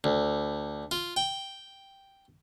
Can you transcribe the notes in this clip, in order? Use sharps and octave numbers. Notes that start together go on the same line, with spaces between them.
D2
F4
G5